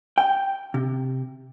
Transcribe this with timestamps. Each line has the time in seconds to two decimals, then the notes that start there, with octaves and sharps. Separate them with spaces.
0.18 G5
0.74 C3